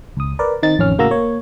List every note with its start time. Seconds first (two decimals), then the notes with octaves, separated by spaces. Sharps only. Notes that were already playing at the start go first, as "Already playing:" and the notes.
0.17 C#2 D#6
0.39 A#4 B4 D5
0.63 D#3 C4 D#4 A6
0.78 A1 F2 D#3 C#4 F6
0.98 A2 C#3 A#3 F#4 A#5 E6
1.11 A#3 C#5